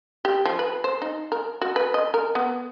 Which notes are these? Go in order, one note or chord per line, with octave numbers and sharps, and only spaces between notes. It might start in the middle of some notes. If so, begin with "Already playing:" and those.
G4
F3
B4
C5
D#4
A#4
F#4
B4
D#5
A#4
B3